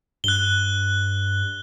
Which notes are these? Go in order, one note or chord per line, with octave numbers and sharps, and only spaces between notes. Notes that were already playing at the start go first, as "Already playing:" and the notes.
G2 F#6 G7